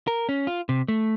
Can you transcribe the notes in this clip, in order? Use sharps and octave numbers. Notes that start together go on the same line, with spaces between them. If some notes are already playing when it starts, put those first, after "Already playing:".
A#4
C#4
F4
C3
A3